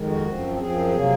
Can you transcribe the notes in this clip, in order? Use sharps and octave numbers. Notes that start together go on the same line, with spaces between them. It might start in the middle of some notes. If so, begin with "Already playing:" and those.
Already playing: F2 D#3 G#3
F#4
F#2 F3 C4
F#2 F3 C4 G#4
C3 F#3 A#3